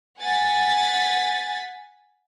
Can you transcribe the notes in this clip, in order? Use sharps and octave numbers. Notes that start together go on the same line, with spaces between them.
F#5 G#5 A6 B6